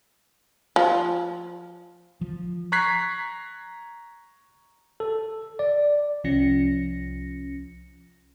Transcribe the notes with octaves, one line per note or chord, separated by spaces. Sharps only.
F3
F3
A#5 C#6 F#6 G#6 B6 C7
A4
D5
C2 F3 C#4 A#6 C#7